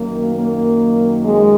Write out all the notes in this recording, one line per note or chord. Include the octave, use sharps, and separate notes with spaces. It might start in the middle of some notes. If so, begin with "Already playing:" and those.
Already playing: F#2 D#3 F#3 A#3
A#3
G#3